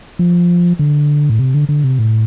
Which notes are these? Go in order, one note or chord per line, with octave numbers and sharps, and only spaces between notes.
F3
D3
A2
C3
D3
D3
C3
A2